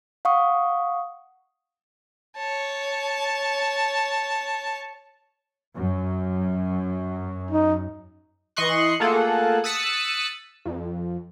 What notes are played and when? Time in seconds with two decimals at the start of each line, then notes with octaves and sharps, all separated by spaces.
0.25 F5 F#5 C#6 D#6
2.36 C#5 A5
5.76 F#2
7.51 D#4
8.57 E3 D#5 C6 C#6 F#6
9.00 A3 A#3 F4 G#4 A4 F#5
9.64 D#6 E6 F#6 A6 B6 C#7
10.65 F2